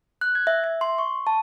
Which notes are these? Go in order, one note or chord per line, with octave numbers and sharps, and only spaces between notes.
F#6
G#6
E5
E5
C6
C#6
A5